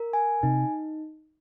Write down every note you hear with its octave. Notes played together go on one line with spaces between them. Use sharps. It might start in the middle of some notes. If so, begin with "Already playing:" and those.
Already playing: A#4
G#5
C3 D#4